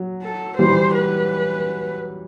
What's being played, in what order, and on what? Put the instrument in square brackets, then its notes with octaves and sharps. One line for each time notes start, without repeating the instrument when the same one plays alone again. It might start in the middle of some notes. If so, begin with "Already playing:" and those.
Already playing: [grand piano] F#3
[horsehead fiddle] A4
[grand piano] E3 G3 [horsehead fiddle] C5
[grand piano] E3
[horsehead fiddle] B4